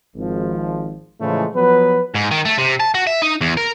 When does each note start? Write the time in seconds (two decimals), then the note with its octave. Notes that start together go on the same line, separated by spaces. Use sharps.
0.15 G#1 F3
1.20 A2 C#3 E3 F3 G#3 A3
1.54 F3 F#3 B3 B4
2.15 G#2
2.31 D#3
2.45 A3
2.58 C3
2.80 A5
2.95 F#4
3.07 E5
3.22 D#4
3.41 E2
3.57 A#4